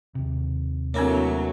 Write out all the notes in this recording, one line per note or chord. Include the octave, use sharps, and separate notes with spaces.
D#2 C3
E3 F#3 A3 A#3 C4 D4 C#5 E5